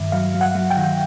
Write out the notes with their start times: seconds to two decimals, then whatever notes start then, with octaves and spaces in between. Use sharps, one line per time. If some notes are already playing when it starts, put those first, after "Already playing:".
Already playing: G2 D#3 E5
0.12 F#3 F5
0.34 F#3
0.41 F#5
0.55 F#3
0.70 G5
0.77 D#3